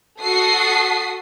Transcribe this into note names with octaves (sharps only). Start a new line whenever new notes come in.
F#4 A4 D#6 C7